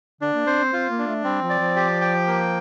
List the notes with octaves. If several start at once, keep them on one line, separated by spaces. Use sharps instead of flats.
D3 D4
A#3
C4 C5
C4
C4 F4
A#3
D4
A3
G3 C4
F3
D5
F3
G4
G5
A#3